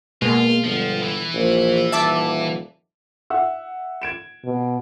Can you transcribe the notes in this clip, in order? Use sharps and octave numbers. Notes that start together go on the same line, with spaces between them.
B2 G#3 A#3 F4
G1 F3
E3
A#1
D#1 E5 A5 D6
E5 F#5 E6
G#6 D7 E7
B2